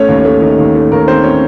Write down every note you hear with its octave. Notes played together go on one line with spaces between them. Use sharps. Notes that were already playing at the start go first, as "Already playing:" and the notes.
Already playing: A3 C#4 C#5
D#2
A3
D#3
D#2
A3
D#2 A#4
D#3 C4 C5
C#4 C#5